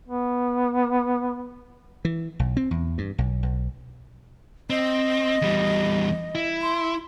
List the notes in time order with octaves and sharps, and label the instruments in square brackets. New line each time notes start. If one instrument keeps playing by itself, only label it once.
[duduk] B3
[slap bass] E3
B1
C4
E2
G2
B1
B1
[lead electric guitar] C4 [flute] D#5
[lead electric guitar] E2 G3
E4
[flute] C6